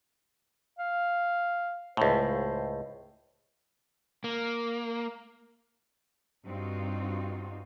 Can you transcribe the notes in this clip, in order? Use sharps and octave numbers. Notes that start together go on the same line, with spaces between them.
F5
C#2 A2 C5
A#3
G2 C4 D#4 F4 F#4